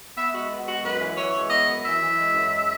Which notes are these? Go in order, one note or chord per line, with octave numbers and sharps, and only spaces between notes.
B3 E5
G#3 F#4
B3
G#3 F#4
F#2 B4
E3
E3 C#5
G#3
B3 D#5
F#2
E3 E5
E3
G#3
F#2
G#3